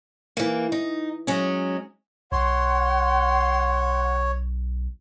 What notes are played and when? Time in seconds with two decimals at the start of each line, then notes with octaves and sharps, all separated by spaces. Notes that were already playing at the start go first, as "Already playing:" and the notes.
0.37 E3 A#3
0.72 D#4
1.27 F#3 G#3 C#4
2.32 B1 C#5 F#5 C6